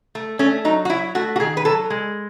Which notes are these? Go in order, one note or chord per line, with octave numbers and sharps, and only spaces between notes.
A3
A3 C#4
F#3 D#4
F#4
F#3 E4
A3 F#4
F#4
D#3 G#4
B4
F#3 A4
G#3